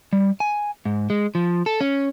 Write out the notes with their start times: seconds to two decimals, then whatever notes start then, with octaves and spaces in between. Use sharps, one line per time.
0.13 G3
0.40 G#5
0.85 G#2
1.10 G#3
1.35 F3
1.66 A4
1.81 C#4